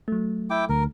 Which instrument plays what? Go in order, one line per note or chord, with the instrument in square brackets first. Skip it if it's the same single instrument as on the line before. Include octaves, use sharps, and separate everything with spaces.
[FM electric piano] F#3 A3
[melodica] E4 G5 D6
[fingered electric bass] D2 [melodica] A#4